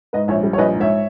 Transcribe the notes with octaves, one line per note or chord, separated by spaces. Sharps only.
G#2 B4 D#5
A#1 C#5 E5
G3
C#5
A#1 B4 D#5
G#2
C#5 E5